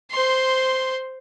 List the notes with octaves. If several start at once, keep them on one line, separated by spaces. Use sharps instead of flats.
C5 C6